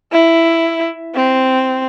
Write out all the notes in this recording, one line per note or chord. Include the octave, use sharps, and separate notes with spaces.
E4
C4